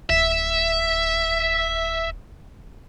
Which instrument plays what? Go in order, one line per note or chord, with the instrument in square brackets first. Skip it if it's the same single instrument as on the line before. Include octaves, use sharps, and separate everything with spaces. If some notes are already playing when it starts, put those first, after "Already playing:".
[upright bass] D1 [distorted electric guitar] E5